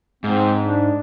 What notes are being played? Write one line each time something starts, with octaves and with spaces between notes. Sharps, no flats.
G#2 C4
D4